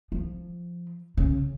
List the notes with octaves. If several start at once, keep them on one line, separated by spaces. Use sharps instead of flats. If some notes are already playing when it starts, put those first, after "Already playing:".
F3
C#3